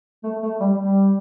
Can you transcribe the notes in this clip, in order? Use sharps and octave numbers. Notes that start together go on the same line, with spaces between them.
A3
A3
G3
G3